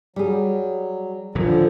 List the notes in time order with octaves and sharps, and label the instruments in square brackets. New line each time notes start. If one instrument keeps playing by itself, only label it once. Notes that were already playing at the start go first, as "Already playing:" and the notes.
[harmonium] F#3 [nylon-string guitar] G3 G#4
[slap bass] D#1 A#2 F#3 [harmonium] D3 F3